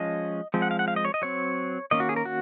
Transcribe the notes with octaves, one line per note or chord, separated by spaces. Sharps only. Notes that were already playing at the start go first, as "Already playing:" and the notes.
Already playing: F3 G#3 C#4 D#5
F3 G#3 C4
F#5
F5
F#5
F5
D#5
C#5
D#5
F#3 C4 C#5
D#3 A#3 C#4 D#5
F#4
G#4
A#4
F#4